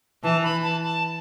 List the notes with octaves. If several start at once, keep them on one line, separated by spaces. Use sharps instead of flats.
E3 A5
B5
A5
A5